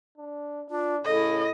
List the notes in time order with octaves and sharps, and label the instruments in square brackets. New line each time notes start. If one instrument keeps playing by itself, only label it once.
[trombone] D4
[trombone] D4 [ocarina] F4
[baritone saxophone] A2 [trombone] C#3 [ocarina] A4 [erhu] D#5